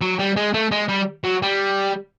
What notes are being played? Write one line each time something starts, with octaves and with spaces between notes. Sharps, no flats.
F#3
G3
G#3
A3
G#3
G3
F#3
G3